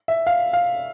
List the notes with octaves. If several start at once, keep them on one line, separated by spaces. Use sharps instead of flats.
E5
F5
F5